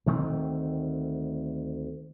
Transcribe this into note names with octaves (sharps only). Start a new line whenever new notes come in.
D2 D#3 A3 C4